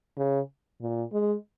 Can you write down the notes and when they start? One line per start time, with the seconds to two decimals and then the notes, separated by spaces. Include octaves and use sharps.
0.17 C#3
0.81 A#2
1.13 G#3